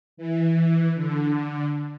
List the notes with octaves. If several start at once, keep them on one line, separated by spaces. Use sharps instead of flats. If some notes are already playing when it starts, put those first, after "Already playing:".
E3
D3